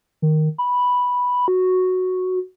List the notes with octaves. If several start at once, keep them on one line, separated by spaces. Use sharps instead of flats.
D#3
B5
F#4